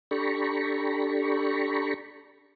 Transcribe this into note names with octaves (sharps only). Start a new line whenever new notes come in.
D4 G4 A4 A#5 B5 C#6